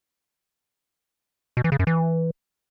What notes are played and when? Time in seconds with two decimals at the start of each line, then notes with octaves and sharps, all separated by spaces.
1.57 B2
1.64 E3
1.72 C#3
1.79 F#2
1.87 E3